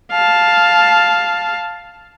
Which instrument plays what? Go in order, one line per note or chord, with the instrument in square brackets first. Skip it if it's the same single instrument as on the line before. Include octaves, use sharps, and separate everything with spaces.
[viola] F5 A5